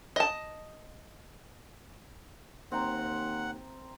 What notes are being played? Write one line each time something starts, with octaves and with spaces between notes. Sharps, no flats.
D#5 A5
D#2 C4 F#5 A#5